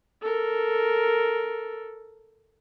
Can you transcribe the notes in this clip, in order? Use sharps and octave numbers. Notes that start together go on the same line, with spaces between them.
A4 A#4